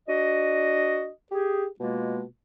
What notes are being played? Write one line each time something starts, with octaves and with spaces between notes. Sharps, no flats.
D4 F#4 D#5
G4 G#4
B2 G#3 A#3 F4